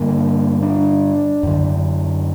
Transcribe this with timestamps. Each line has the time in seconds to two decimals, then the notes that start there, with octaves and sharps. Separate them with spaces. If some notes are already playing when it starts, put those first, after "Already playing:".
Already playing: G2 D3 A#3
0.63 D4
1.43 F#2 D3